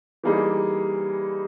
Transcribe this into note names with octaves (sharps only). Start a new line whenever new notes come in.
E3 G3 A#3 D#4 G#4